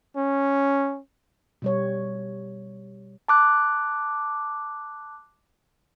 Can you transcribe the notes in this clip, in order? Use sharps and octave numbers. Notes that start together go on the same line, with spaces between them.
C#4
B2 G3 C#5
A5 D6 F#6